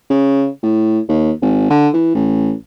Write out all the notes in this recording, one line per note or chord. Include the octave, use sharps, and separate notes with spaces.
C#3
A2
D#2
G#1
D3
E3
A1